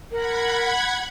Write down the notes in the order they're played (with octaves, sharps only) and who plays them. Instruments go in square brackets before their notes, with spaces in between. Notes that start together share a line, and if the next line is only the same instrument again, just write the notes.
[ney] A#4 [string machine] F#5 B5 G#6